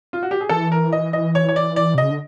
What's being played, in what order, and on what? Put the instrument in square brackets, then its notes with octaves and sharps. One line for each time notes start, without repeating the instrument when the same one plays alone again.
[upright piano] F4
F#4
G4
G#4
[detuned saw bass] E3 [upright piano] A4
[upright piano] A#4
D#5
D#5
C#5
C#5
D5
D5
[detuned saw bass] C3
[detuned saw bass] C#3 [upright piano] D#5
[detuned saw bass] D3